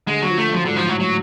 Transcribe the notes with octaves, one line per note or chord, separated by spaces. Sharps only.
D3 G#3
F#3
F3
A3
F3 F#3
G#2 D3
F3
A2 F#3
F#3